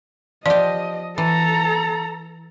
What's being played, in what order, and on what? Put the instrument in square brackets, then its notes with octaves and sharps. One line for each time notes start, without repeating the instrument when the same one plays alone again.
[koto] F3 G4 [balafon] D5 [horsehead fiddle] D#5
[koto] E3 [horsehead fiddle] A4 A#5